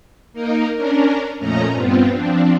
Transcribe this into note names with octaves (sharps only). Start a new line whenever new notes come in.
A#3 D#4 A#4
C#4 D4 A#4
F2 A#2 A3 C#4 D#5 A#5
G2 B3 C4 F4
F3 C4 D4